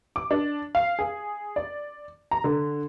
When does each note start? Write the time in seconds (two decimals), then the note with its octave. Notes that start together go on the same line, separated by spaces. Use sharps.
0.16 D6
0.31 D4
0.75 F5
0.99 G#4
1.56 D5
2.31 A#5
2.44 D3